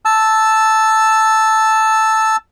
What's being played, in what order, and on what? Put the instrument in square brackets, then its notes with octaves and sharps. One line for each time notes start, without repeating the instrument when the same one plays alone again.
[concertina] A5 E6